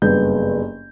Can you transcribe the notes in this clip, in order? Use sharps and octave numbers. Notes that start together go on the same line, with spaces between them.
F#1 G2 B3 G6